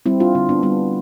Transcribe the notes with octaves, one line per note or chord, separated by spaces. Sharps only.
G3 C4 E4
D4 F4
D3 C4
B3 D4
G3 B3 D4